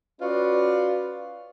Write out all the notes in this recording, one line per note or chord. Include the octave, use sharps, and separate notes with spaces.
C#4 F4 F#4 B4 D5